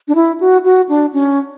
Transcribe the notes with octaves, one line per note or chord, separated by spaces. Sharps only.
D4
E4
F#4
F#4
D4
C#4